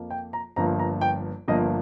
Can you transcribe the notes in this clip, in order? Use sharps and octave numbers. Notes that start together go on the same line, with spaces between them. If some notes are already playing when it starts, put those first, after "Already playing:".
Already playing: F2 F3 A#3
G5
A#5
G1 G2 F3 A#3 A#5
A#5
G5
G1 G2 F3 A#3 D#5